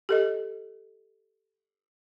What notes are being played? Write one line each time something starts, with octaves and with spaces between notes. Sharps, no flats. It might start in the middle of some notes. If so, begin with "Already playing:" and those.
G4 A4 D#5